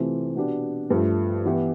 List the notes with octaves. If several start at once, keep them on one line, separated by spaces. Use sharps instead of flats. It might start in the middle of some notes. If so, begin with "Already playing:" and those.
Already playing: C3 E3 A3 C4 F4
B2 B3 D4 G4
G2 F3 A3
E3 B3 E4 G4